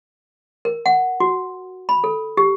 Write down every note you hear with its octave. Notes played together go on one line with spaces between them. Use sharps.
A#4
F#5
F#4
B5
A4
G4